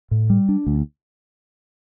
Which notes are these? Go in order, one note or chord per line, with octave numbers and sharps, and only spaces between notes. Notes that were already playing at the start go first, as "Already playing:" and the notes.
A2
G3
D4
D2